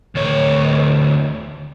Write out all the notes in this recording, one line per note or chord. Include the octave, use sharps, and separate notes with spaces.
D2 C#5